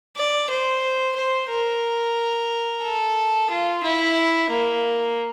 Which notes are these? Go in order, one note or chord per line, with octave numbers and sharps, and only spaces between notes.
D5
C5
C5
A#4
A4
F4
E4
A#3